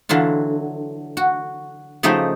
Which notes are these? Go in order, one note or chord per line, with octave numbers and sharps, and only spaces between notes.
D3 E3 F#3 F4
F#4
C#3 F3 A3 D#4 G4 A4